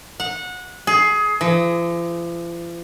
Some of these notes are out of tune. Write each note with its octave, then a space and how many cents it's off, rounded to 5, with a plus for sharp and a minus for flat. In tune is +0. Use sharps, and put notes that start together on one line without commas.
F#5 -20
G#4 +20
F3 -45